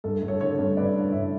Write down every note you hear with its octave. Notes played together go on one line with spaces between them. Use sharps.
G2 A4
G2
A4 C#5
D3 A4 C#5
G2
G2 B4 D5
D3
G2 C#5 E5